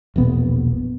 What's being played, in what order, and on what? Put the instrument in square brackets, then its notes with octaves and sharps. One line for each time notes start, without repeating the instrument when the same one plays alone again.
[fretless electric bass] E1 A#1 B3